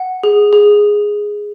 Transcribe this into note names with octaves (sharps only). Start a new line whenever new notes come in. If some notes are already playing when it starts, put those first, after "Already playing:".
Already playing: F#5
G#4
G#4